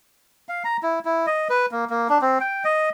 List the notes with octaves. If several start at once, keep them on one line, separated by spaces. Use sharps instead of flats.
F5
A#5
E4
E4
D#5
B4
A#3
A#3
D4
C4
G5
D#5